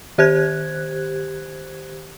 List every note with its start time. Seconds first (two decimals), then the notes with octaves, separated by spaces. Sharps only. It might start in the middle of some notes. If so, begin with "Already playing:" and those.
0.18 D#3 G4 C5 F#6 G#6